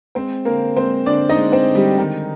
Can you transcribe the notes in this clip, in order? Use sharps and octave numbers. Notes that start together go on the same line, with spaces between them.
G#3 C4 C5
D3 A#3 A#4
G#3 C4 C5
D3 D4 D5
D#4 D#5
G#3
C4 C5
D3
G3 G4
D#3 G#3 D#4